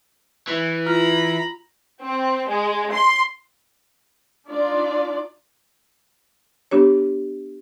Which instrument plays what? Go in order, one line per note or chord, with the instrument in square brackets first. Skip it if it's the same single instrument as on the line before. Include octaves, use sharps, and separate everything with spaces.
[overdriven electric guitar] E3
[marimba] F4 [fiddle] A#5 B5
[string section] C4
G#3
C6
[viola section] D4 D#4 F4 D5
[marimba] B3 D4 G4 C#5